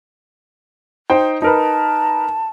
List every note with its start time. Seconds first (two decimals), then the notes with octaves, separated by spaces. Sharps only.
1.10 D#4 C5 G5
1.42 D#4 A#4 B4 A5